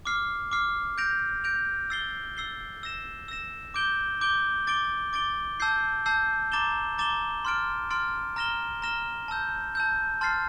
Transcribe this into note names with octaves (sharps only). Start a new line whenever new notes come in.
D6 F6 C7
D6 F6 C7
G6 A#6 D7 F7
G6 A#6 D7 F7
E6 A6 C7 G7
E6 A6 C7 G7
E6 A#6 E7
E6 A#6 E7
D6 G6 D7 G7
D6 G6 D7 G7
D6 A6 D7 G7
D6 A6 D7 G7
A5 E6 G6 C7
A5 E6 G6 C7
A#5 D6 A6 E7 G7
A#5 D6 A6 E7 G7
C6 F6 A6 D7
C6 F6 A6 D7
A#5 F6 A#6 E7 G7
A#5 F6 A#6 E7 G7
A5 E6 G6
A5 E6 G6
A5 C6 F6 A6 C7